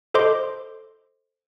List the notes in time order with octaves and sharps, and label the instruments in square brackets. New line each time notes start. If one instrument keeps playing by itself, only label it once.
[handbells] A4 C5 D#5 C6 D6